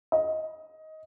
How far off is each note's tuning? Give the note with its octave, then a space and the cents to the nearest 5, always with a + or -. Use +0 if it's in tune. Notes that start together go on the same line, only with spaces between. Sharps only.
D#5 +15